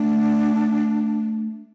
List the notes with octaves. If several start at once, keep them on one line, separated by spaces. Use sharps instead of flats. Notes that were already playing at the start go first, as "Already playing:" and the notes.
Already playing: A3 D4